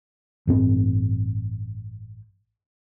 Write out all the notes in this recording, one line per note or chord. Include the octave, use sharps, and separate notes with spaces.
A1 G2 C4